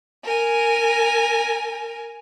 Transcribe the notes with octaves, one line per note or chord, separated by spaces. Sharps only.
A#4 G#5